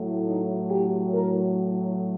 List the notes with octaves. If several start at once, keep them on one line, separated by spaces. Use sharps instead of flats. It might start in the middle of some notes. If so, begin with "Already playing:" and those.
Already playing: A2 F#3
D#4
G4
A#4